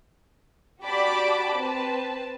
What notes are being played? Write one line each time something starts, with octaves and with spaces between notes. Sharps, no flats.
F#4 G4 D5 A5 B5 D6
C4 B4 A5